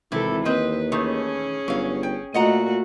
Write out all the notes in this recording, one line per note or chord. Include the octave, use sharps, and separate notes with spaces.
G#1 C3 E3 E4 A4
D#2 C4 B4 D#5
D#3 E3 A3 C#4 G#4
G1 F#3 F5
G5
A#2 A3 F#4 D#5 F#5 A#5